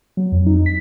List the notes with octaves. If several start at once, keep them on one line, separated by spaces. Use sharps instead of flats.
F#3
F2
D#4
B6